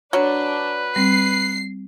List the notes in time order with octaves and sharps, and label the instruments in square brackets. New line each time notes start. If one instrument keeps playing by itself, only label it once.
[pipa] F#3 [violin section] D4 [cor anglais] B4
[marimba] G3 C4 [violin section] C7